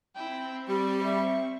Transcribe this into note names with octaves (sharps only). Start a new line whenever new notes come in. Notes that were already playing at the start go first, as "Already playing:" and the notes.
C4 E4 G5
G3 G4 C#6
E5